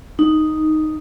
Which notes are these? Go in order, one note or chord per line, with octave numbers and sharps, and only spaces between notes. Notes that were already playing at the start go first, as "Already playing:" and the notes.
D#4